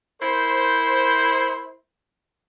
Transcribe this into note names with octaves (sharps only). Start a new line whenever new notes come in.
E4 A#4 C5